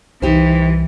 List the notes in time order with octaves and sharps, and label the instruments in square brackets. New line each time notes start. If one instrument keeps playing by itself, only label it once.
[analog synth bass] C2 [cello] E3 [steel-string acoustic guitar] D#4 G4 C5